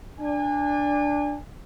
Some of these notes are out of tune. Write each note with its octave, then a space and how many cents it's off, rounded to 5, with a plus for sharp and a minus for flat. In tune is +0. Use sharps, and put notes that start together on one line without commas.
D4 +0 G#5 -35